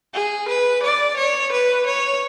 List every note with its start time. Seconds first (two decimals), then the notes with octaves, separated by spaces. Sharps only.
0.14 G#4
0.49 B4
0.83 D5
1.17 C#5
1.52 B4
1.87 C#5